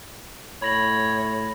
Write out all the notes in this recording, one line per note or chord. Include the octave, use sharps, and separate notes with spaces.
A2 C#5 B5 A#6 F#7